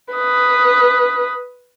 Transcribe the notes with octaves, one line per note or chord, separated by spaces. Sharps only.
B4 D#6